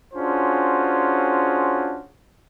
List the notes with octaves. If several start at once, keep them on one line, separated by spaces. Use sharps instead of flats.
C#4 D4 F4 F#4 G#4 C5